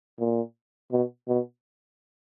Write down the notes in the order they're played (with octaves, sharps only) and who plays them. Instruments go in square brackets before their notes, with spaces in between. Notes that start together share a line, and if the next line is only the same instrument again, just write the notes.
[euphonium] A#2
B2
B2